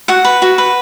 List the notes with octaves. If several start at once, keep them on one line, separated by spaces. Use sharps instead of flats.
F#4 F#5
B4
F#4
B4